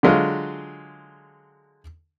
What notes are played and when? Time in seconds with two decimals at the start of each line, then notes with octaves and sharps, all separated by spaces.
0.03 D3 F#3 G#3 F4